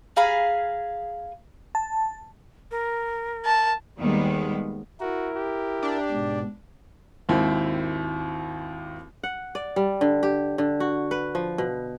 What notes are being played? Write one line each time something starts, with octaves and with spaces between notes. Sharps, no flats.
G#4 F5 A#5 B5
A5
A#4
A5
D#2 D#3 G3 G#3 B3
E4 F#4 A#4
G4
D4
G#2 B2
G#1 D#2 C4 E4
F#5
D5
G3
D3
G4
D3
F#4
B4
F3
B2